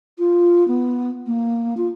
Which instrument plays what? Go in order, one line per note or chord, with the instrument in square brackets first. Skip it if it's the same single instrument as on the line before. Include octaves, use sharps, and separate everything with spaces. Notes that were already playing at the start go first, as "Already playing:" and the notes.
[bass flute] F4
B3
A#3
F4